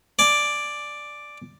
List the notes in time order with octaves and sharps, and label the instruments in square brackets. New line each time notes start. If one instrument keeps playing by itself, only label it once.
[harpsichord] D5 G#5